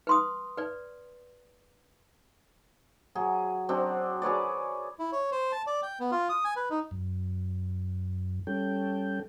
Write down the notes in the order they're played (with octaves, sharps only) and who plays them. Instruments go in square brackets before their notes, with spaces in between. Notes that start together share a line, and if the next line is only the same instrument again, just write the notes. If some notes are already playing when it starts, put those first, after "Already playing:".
[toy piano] B4 C6 D#6
B4 D5
[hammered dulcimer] F#3 G#4
F#3 C4 D4 D#5
G#4 B4 C#5 D5
[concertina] E4
C#5
C5
A5
D5
G5
B3
F4
D#6
G#5
B4
D#4
[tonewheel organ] F#2
G3 C#4 A4 G5